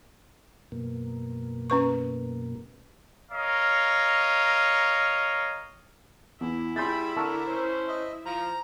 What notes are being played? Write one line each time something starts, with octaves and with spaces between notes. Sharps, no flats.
F#2 B2 A#3
C#4 B4 C#6
A#4 C#5 D#5 F5
E2 E4
G3 G#4 E5 B5 C6 G6 A6
D3 A#4 A5 C#6 E6
C#4 C5
D#5 E5
F3 A#5